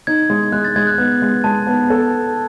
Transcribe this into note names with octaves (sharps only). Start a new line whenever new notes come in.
D#4 G#6
G#3
G#3 F#6
A6
G#3 G#6
F#6
B3 F#6
G#3
G#3 A5
B3
A4